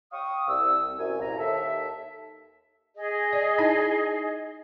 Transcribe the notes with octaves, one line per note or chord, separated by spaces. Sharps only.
F5 G5 C#6 D#6
C2 E6
C2 F#2 G#5
C2 A#2 A#5
D#2 A4 E5
G#4 D#5
D5
D#4 E4 A5